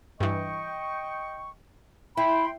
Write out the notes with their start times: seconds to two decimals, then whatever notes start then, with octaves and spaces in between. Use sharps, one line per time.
0.20 G2 E3 D#5 G5 C#6
2.17 E4 G5 B5 C6